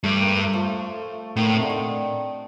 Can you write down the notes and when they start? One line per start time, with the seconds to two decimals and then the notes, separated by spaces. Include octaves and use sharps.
0.03 G2 A3
0.21 A#3
0.37 A3
0.54 F3
1.36 A2 D#3
1.54 C3
1.63 D3
1.70 D#3